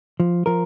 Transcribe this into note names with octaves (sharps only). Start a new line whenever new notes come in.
F3
F3 A#4